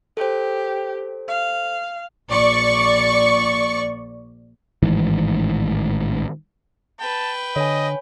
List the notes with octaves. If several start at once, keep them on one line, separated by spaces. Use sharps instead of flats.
G4 A4 C5
F5
A#1 D5 C#6
A1 G#2 D#3 E3
B4 G5 A5
D3 C#5 D#5 G#5